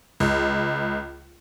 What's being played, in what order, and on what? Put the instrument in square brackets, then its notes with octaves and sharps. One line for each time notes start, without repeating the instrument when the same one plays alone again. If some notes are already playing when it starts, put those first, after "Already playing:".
[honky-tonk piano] C#2